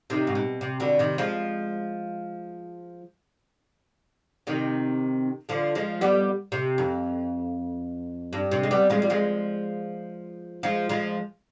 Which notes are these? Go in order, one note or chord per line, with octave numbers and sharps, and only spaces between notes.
C3 D#3
G#2
B2
C3
B2 D3
C3 D#3
F3 G#3
C3 D#3
D3 F3
F3 G#3
G3 B3
C3
F2
G2
C3
G#3
G3 B3
F3 G#3
G3
F3 G#3
F3 G#3
F3 G#3